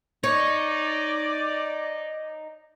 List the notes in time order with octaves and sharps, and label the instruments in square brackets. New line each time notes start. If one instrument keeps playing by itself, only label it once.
[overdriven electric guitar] D#4 [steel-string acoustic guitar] C#5 [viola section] D5